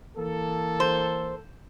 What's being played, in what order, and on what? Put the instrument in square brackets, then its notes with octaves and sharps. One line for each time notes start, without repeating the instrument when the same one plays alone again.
[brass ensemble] E3 A#3 A4
[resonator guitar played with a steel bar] C5